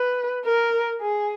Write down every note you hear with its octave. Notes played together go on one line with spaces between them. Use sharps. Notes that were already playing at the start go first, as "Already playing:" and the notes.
Already playing: B4
A#4
G#4